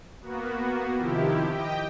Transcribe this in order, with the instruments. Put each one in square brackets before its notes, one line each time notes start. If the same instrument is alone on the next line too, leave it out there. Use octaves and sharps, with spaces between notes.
[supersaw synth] A#3 B3 F#4
C3 D#3 F3 E4 G4
G4 D#5 G5